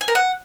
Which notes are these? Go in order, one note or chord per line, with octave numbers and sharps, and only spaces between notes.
G#5
A#4
F#5